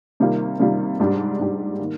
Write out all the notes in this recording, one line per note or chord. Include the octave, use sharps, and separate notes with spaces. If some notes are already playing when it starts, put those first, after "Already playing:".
C3 D#3 G3 A#3 F4
C3 D#3 G3 A#3 F4
G#2 G3 D4 G4
G#2 G3 D4 G4
D#3 A#3